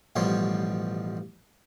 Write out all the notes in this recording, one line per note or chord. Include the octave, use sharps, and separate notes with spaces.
A1 B2 F3 G3 C#5 C6